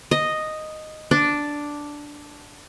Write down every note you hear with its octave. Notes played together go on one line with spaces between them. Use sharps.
D#5
D4